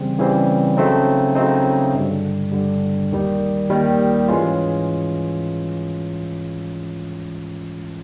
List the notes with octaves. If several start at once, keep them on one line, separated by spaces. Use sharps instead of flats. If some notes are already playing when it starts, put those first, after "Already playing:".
Already playing: C#3 E3 G3 C4
C#3 E3 G3 C4
C#3 F#3 A3 C4 D#4
C#3 F#3 A3 C4 D#4
G2 D3 G3
G2 D3 G3
D#2 D#3 G3
D#2 D#3 G3
G#2 E3 G#3 C#4 F4